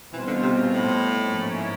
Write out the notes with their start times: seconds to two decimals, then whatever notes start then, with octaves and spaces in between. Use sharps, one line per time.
0.13 B2 E3 G3 C4 F4
0.27 D3
0.42 C3
0.56 A#2
0.72 A2
1.29 G#2 F3 A#3 C#4 E4